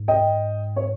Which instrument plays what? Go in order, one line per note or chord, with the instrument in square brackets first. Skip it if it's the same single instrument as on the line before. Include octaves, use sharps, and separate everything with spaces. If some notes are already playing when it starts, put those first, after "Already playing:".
Already playing: [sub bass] G#2
[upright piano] D#5 G5
C#5